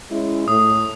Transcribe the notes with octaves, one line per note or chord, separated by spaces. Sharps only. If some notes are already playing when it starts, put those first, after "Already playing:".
G#3 C#4 E4
A2 D#6